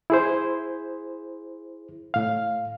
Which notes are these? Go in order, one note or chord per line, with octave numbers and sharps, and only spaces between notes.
E4 G#4 C5
A2 F5